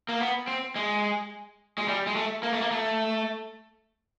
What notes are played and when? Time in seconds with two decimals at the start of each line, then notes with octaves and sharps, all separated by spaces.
0.09 A#3
0.20 B3
0.48 C4
0.76 G#3
1.78 G#3
1.88 G3
2.07 G#3
2.16 A3
2.43 A#3
2.53 A3
2.61 A#3
2.71 A3